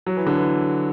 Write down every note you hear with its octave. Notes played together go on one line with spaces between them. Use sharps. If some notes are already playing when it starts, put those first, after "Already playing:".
F#3
E3
D3
E3